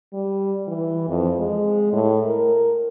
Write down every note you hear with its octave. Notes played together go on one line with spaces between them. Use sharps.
G3
E3
F2
G#3
A2
A#4